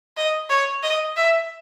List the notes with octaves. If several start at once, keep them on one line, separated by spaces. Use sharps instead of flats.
D#5
C#5
D#5
E5